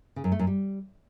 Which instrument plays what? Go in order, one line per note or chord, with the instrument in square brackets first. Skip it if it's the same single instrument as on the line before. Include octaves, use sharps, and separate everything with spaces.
[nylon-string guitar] C#3
F#2
A3
F#2
G3